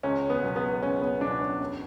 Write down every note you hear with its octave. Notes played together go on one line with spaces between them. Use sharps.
C#2 C#4
B3
B2 F#3
B3
C#2 C#4
B3
B2 F#3 D4
C#4
F#2